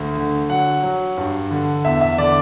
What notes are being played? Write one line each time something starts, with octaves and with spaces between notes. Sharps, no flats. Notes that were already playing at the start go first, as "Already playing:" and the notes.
Already playing: D2
D3
F#3 F#5
F#3
G2
D3
E2 E5
E5
D3 D5